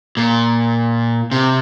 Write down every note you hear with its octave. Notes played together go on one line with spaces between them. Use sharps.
A#2
C3